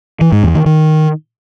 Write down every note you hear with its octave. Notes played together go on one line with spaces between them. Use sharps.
E3
G#2
E2
D#3
D#3